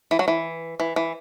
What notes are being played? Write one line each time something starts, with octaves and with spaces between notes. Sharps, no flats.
E3
F#3
E3
E3
E3